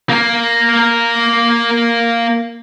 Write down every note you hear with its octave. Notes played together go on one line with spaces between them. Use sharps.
A#3 A#4